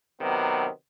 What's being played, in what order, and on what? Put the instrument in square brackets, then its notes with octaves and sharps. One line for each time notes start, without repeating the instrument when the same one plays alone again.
[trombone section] C3 D#3 F#3 B3